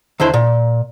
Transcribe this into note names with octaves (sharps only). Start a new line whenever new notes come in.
D#2 D3 E4 C5
A#2